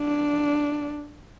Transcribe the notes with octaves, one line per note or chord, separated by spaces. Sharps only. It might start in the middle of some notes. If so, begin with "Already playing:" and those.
Already playing: D4